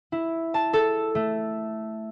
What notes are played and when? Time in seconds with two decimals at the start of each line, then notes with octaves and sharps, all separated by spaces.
0.12 E4
0.54 A5
0.73 A4
1.15 A3